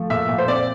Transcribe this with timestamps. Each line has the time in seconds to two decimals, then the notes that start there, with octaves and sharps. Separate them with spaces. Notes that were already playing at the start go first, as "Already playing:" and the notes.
Already playing: F3 A3
0.10 A#2 E5
0.29 A#2
0.38 C5
0.48 C4 D5